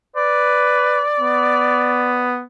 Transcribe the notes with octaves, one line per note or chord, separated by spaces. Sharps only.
B4 D5
B3